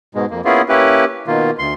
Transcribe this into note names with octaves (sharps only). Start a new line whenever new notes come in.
G#2 B2 G#3
F2 A#3
A#3 B3 C#4 E4 F4 G#4
A#3 C#4 E4 G4 B4
B2 D#3 A#3 F4
D2 C6